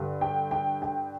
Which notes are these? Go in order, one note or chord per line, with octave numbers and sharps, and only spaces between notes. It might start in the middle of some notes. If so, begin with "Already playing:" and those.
Already playing: G2 D3
G5
G5
G5